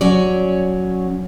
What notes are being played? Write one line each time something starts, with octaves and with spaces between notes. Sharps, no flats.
F#3 C#4 C#5 D5